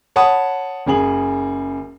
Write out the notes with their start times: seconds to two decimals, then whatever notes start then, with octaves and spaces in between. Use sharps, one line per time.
0.16 C#5 F#5 A5 B5 D#6
0.86 F#1 C#3 G#4 F#7